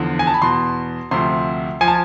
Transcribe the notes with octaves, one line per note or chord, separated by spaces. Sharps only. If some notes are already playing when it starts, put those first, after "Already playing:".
Already playing: E2 D3 F3
G#5
A5
B5
E2 B2 C6
D2 C3 F3 C6
F3 G#5
A5